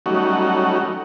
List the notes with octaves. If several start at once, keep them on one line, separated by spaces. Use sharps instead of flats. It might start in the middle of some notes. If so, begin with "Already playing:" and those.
F#3 G3 A3 C#4 D#4 F#4